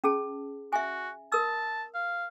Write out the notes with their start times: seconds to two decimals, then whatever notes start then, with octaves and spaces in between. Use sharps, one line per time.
0.04 C#4 G#4 A5
0.73 F#4 E5 G#5
1.32 A#4 A5 E6
1.94 F5